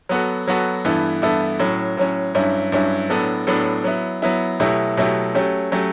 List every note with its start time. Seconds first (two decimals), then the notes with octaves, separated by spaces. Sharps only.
0.09 F#3 B3 F#4 A4
0.48 F#3 B3 F#4 A4
0.85 G2 E3 B3 E4 A4
1.22 G2 E3 B3 E4 A4
1.60 A2 F#3 C#4
1.97 A2 F#3 C#4
2.35 G2 F#3 C#4 E4
2.72 G2 F#3 C#4 E4
3.10 A2 F#3 B3 D4 A4
3.47 A2 F#3 B3 D4 A4
3.84 F#3 B3 E4
4.22 F#3 B3 E4
4.60 B2 F#3 A3 E4 G4
4.97 B2 F#3 A3 E4 G4
5.35 F#3 A3 C#4 G4
5.72 F#3 A3 C#4 G4